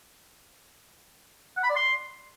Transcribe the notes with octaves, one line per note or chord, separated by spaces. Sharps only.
F#5
B5
D5
C6